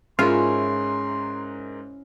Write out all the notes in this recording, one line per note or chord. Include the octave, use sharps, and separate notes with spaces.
G#2 G#3 C#4 E4 F4 A#4 C6